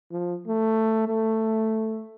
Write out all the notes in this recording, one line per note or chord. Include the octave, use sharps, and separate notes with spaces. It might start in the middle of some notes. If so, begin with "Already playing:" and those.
F3
A3
A3